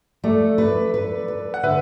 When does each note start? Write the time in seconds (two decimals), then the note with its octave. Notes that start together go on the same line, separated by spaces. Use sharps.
0.24 A3 A4 D5
0.58 B4
0.94 B4
1.28 B4
1.54 F#5
1.63 D3 B4 E5